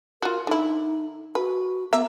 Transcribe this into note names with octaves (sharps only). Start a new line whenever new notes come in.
F4 F#4 A#4
D3 D#4 E4
F#4 B4
A#3 B3 E5 A#5